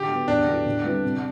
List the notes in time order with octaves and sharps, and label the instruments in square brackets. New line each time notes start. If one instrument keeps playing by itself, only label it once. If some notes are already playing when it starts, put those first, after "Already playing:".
Already playing: [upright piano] D3 [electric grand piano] G4
[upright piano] F#3 B3
[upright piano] E2 [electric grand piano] D4
[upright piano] D3 F#3 B3 E4
D3
G3 C4 E4 B4
C3